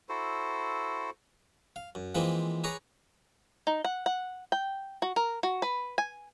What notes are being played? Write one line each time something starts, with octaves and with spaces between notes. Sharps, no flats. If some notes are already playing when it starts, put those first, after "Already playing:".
E4 F#4 A4 C5
F5
F#2
E3 F3 G#3 A#3 C4 E4
G#4 B4 C#5 A#5 D6
D#4
F#5
F#5
G5
F#4
A#4
F#4
B4
G#5